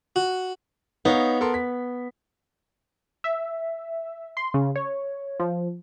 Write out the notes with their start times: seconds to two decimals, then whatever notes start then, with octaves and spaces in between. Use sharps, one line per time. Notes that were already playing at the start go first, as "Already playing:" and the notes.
0.16 F#4
1.05 B3 D#4 C#5 F5
1.41 A4 A#4 C6
1.54 B6
3.24 E5
4.37 C6
4.54 C#3
4.76 C#5
5.40 F3